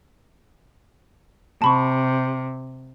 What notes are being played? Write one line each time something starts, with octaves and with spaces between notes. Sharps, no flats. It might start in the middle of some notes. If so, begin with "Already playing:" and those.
C3 A5 B5 C#6